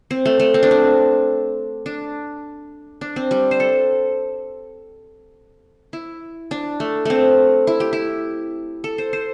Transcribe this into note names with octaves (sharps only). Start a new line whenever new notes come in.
C4
A3
A3
C4
D4
C4
D4
D4
C4
G3
C5
A4
E4
D4
A3
A3 C4
E4
G4
E4
A4
C5
C5